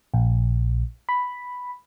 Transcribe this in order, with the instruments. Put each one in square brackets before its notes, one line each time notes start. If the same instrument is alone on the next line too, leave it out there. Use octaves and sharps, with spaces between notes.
[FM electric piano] A#1
B5